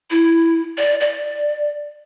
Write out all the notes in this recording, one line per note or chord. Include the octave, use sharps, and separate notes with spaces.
E4
D5
D5